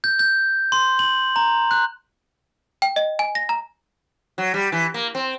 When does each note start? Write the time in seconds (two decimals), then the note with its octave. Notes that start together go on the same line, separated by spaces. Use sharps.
0.04 G6
0.19 G6
0.72 C6
0.99 F#7
1.36 A#5
1.71 F#6
2.82 G5
2.96 D#5
3.19 G#5
3.35 A#6
3.49 A#5
4.38 F#3
4.54 G3
4.72 E3
4.94 A#3
5.15 C4